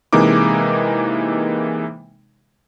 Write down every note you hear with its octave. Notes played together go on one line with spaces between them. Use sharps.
C3 E3 G#3 A#3 D#4 D6